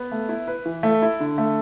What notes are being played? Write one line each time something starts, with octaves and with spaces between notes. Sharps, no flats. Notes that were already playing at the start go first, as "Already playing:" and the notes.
Already playing: B3
A3
E4
B4
E3
A3
E4
D3
A3